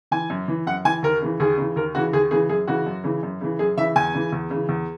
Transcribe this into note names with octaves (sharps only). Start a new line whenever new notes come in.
E3 G#5
F#2
E3
F#2 F#5
E3 G#5
D#2 A#4
C#3 E3
D#2 G#4
C#3 E3
D#2 A#4
C#3 E3 F#4
D#2 G#4
C#3 E3 G#4
F#2 G#4
C#3 E3 F#4
F#2
C#3 E3
F#2
C#3 E3
F#2 G#4
C#3 E3 E5
E2 G#5
C#3 E3
E2
C#3 E3
E2